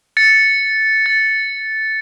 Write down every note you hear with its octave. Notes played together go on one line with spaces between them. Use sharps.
A6 C#7
A6